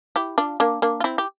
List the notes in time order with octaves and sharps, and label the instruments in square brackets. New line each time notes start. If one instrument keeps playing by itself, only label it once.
[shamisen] E4 G4
D4 F4
A#3 D4
A#3 D4
F4
C4 E4
G4